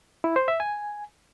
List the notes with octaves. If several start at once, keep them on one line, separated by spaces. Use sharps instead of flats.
E4
C5
E5
G#5